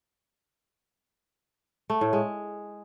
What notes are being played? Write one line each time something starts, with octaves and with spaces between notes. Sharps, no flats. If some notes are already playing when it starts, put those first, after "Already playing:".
A3
A2
G#3